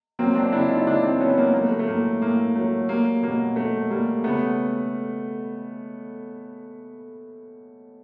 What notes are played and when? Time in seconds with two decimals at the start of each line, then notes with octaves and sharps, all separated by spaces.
0.19 F#3 A#3 C4
0.35 C4 D4
0.52 C#3 D4 E4
0.69 D#4 F4
0.86 C#3 D4 E4
1.03 C4 D4
1.20 F#3 B3 C#4
1.38 A#3
1.54 F#3 A#3
1.63 A3
1.79 A3
1.88 A2 A#3
2.21 A2 A#3
2.56 F#3 A3
2.89 G3 A#3
3.22 B2 A#3
3.56 B2 A3
3.90 G3 A#3
4.24 C#3 A3 B3